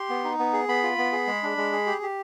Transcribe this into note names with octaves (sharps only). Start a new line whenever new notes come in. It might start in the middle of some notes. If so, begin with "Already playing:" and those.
Already playing: G4 C6
B3
D#4
B3
G#4
B3 B5
F4
B3
G#4
G#3
D4
G#3
G#4
G4
G4